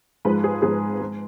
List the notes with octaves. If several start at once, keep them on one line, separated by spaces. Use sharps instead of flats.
G#2 F3 G#3 B4
G#4
G#2 F3 G#3 G#4
G#3